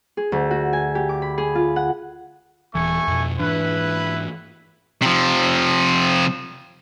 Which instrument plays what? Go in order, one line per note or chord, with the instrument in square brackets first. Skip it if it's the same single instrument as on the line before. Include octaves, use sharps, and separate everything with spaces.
[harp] G#4
D2
F#4
G#5
G4
D6
B5
G#4
F4
F#5
[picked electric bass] D#1 E3 [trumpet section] A3 G#5 C#6
[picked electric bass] F2 B2
[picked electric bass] G#2 E3 D4 [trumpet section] E4 B4
[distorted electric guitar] C3 F3